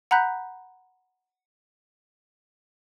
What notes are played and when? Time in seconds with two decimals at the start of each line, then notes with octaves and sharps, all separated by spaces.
0.11 F#5 A#5 B5 F#6 G6 B6